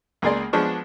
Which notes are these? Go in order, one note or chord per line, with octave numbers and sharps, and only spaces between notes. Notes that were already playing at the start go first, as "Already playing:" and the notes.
C#2 A#3 G#4 D5 C6
F3 G#3 B3 D4 C#6